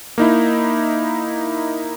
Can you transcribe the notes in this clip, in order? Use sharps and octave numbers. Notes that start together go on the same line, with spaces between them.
A#3 D#4 E4